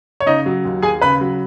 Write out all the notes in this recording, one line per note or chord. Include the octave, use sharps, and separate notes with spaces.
C#5
C#3 D#4 D#5
F#3
D#2
D#2 G#4 G#5
C#3 B4 B5
F#3